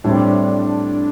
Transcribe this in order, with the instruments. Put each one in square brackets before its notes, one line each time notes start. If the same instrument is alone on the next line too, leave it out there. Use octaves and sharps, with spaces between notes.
[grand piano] A2 G3 C4 [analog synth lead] D4